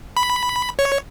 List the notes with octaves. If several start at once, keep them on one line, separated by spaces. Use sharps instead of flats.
B5
C#5